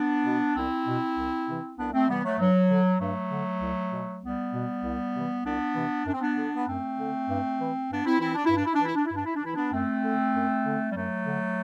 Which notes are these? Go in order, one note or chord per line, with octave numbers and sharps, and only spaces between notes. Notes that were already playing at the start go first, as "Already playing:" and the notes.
Already playing: B3 D4
B2
C2 C4 E4
B2
C2
C3 E3
C2 B3 D4
A3 C4
C3 E3 G3 B3
F#3 A3
G2 F#3
D3
G2 F#3 A3
D3
C2
B2
C2 G3 B3
B2
C2
C3 E3
C2 B3 D4
C3 E3
F#2 D4
C4
B3 D4
D3
B3
F#2 A3 C4
D3
G2
E3
G2 B3 D4
C4 E4
E3 C4 E4
D4
E4
G2 D4
E4
D4
E3 E4
D4
E4
G2 D4
E4
D4
E3 E4
B3 D4
F#2 A3 C4
D3
F#2
D3
G3
F#2 F#3 A3
D3